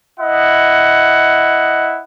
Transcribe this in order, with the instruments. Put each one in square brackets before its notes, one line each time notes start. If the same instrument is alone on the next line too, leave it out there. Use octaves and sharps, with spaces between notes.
[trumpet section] E4 D#5 F#5